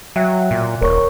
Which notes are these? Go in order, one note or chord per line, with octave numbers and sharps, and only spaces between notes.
F#3 E5 G5 F#6
A#2
D#1 A#4 C#5 C#6